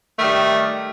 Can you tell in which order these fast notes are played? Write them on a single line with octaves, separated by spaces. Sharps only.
A3 D#3 G3